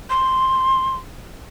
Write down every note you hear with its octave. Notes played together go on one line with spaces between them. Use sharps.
C6